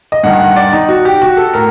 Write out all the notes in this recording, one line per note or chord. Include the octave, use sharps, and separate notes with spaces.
D#5
G2 D#3 F#5
F#5
D5
D#4
F#4
G4
F#4
A4
A2 A#4